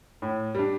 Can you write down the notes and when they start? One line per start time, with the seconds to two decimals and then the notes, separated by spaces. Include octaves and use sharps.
0.22 A2
0.55 G3 D4